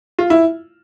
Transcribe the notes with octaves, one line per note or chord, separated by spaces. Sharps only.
F4
E4